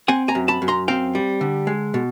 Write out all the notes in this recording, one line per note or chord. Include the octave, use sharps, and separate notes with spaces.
C4 F#5 G#5
G#5 A#5
F#2
A5 B5
F#2
A#5 C6
C4 F5 G5
G3
D3
G#3
B2